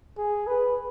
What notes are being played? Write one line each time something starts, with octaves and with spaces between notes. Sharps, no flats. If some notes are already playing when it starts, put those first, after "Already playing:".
G#4
B4